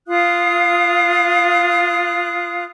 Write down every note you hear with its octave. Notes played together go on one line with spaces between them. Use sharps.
F4 F5 D#6 F#6